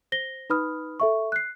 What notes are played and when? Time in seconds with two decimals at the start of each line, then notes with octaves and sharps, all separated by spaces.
0.12 C5 A#6 G7
0.50 D#4 B4 B5 D#6 F6
1.00 A4 E5 C#6
1.32 F#6 C7